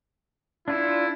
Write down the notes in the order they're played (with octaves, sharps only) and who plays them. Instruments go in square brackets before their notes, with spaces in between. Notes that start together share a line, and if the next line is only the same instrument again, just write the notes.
[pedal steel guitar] D4 F4 A4 [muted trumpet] E4